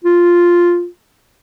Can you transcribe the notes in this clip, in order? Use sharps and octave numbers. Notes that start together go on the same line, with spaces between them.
F4